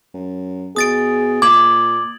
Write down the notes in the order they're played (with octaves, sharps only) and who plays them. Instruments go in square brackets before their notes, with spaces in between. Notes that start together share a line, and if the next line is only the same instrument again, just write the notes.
[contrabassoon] F#2
[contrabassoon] B2 [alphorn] G#4 [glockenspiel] D#6 A6 D7
[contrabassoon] A#2 [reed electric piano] D6 [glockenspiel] G#6 F#7